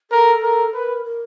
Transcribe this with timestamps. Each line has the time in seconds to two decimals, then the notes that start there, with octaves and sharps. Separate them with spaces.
0.11 A4 A#4
0.43 A#4
0.73 A#4 B4
1.05 A#4